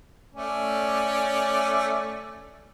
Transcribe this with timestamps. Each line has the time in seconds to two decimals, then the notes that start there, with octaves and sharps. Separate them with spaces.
0.34 A3 C#4 D5